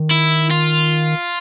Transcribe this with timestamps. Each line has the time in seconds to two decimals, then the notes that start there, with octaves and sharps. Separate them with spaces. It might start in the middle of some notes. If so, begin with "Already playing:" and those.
Already playing: D#3
0.11 E4
0.51 F4